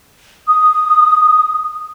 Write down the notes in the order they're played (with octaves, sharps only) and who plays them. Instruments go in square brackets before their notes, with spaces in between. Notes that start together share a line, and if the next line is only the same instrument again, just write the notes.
[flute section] D#6